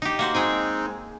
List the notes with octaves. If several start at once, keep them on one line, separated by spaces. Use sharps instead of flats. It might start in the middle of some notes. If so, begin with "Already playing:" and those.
D#4 G4
A#3 F#4 C5
G#3 C4 D#4 G#4 G5 G#5